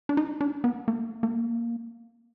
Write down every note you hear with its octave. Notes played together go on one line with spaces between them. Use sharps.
D4
D#4
D4
B3
A#3
A#3